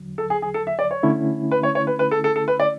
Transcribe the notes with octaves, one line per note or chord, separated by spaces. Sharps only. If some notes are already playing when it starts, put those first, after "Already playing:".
Already playing: E2 D3 F#3
A4
G#4
G#4
A4
E5
D5
C#5
D3 A3 C#4 E4
B4
C#5
C#5
B4
B4
A4
A4
A4
B4
D5